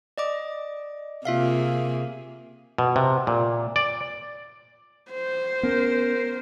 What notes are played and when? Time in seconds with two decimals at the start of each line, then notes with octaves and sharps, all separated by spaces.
0.18 D5 D#5 D6
1.25 C3 A#3 F4 G#4 E5 F5
2.78 B2
2.96 C3
3.27 A#2
3.76 D5
5.11 C5
5.63 B3 C#4 A#4